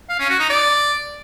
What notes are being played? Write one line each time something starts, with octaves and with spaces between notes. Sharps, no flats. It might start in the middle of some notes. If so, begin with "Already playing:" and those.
F5
C#4
F#4
D#4
D5